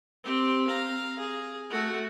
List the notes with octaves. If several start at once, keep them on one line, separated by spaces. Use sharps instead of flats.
C4 G4
F5 A#5
G#4
A3 F#4